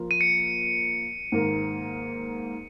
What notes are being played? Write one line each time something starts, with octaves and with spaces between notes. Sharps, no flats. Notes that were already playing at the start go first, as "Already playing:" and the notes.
Already playing: F3 A#3 F4
D#7
C#7
G#2 D#3 A#3